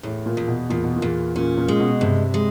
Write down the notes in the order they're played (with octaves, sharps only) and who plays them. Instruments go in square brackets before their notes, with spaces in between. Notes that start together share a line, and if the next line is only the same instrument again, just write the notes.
[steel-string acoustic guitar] E2 [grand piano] A2
[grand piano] A#2
[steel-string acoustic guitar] E2
[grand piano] B2
[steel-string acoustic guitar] E2 [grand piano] A#2
[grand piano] B2
A#2
[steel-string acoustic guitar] E2
[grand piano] A#2 [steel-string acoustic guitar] C#4
[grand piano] A#2
[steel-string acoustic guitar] G#3
[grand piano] B2
[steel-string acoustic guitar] G2 [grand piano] C3
[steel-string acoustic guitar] G#3